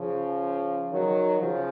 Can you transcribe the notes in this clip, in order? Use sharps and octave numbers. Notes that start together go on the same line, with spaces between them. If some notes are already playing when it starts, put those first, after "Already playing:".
Already playing: C#3 F3
D#3 F#3
C#3 F3